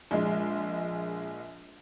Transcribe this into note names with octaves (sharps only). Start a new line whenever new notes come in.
A#1 G#3